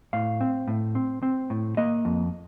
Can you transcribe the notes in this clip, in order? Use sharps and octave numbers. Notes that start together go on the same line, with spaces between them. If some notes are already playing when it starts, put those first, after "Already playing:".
A2 F5
C4
A2
C4
C4
A2
A#3 D#5
F2